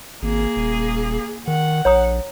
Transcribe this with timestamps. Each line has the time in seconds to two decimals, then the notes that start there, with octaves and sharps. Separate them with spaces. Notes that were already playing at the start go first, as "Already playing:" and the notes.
0.22 G#1 A#3 G#4
0.56 D#1
1.47 D#3 F#5
1.85 A#1 C#5 A#5 D#6